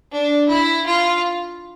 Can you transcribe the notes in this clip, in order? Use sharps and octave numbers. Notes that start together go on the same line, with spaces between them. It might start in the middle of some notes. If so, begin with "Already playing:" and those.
D4
E4
F4